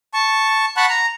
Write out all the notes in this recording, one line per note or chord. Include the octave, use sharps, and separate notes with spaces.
A5 C#6
F#5 A5 B5 C#6 F#6
A#5